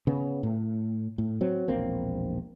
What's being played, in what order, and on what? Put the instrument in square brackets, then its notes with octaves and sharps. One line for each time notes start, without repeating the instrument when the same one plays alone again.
[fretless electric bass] C#3 B3
A2
A2
F#3 C4
E1 A#1 A#3 C4